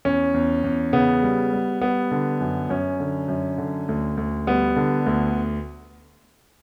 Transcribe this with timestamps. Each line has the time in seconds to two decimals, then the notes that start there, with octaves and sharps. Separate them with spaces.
0.05 E2 C#4
0.34 E2
0.64 E2
0.93 C#3 B3
1.23 G3
1.53 G3
1.81 G3 B3
2.11 D3
2.41 F#2
2.69 F#2 C#4
3.00 D3
3.28 F#2
3.58 D3
3.89 D2
4.17 D2
4.47 G3 B3
4.76 D3
5.06 D2